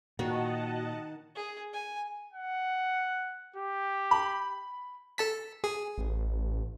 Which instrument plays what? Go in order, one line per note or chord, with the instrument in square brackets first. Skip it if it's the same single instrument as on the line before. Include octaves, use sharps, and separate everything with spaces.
[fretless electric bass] A#2 [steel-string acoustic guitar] D#3 [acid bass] F#4 [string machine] D#5 F#5 A5
[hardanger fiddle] G#4
G#5
[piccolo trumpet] F#5
G4
[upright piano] B5
[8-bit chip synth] A4 A5 B6
G#4
[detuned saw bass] A1